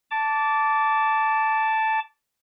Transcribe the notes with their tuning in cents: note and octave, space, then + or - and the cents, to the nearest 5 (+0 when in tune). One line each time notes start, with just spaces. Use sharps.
A5 +0 D6 -20